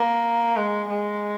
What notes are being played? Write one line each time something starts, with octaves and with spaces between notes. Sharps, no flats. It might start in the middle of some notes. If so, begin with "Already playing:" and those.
Already playing: A#3
G#3
G#3